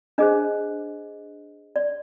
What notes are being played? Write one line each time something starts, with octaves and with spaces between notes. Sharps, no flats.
D4 G#4 C5 D#5
D5